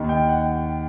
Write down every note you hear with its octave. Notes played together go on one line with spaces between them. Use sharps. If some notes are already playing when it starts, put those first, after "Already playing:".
Already playing: D#2 D#3
G5
F#5